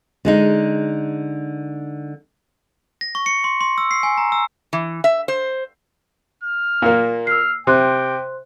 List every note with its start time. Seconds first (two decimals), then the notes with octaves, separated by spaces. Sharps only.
0.25 D3 G#3 D#4
3.01 A#6
3.15 C#6
3.26 C#7
3.44 C6
3.61 C6
3.78 E6
3.91 C7
4.03 G#5
4.18 A#5
4.32 E6
4.73 E3
5.04 E5
5.28 C5
6.43 F6
6.82 A#2 A#3
7.27 E6 F6 C7
7.67 C3 C5 G5 C6 F#6